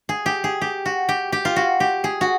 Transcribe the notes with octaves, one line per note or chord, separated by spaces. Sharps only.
G#4
G4
G#4
G4
F#4
G4
G4
F4
F#4
G4
G#4
F#4